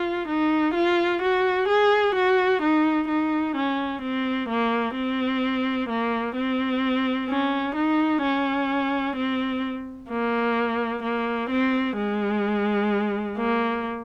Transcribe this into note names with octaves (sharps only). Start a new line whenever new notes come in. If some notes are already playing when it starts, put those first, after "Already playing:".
Already playing: F4
D#4
F4
F#4
G#4
F#4
D#4
D#4
C#4
C4
A#3
C4
A#3
C4
C#4
D#4
C#4
C4
A#3
A#3
C4
G#3
A#3